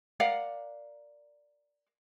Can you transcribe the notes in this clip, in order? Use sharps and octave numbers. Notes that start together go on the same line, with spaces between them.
A#4 D5 F5 F#5